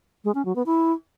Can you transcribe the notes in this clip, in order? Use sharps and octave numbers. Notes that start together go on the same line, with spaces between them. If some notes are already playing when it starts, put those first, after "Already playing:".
G#3
C#4
F#3
B3
E4